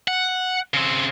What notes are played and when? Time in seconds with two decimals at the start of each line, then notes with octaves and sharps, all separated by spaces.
0.08 F#5
0.74 C#3 C4